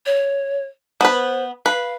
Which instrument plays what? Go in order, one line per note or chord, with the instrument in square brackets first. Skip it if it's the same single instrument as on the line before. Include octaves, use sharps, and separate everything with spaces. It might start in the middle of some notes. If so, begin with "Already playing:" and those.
[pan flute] C#5
[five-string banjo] B3 B4 [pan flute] C5
[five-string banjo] B4 [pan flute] F5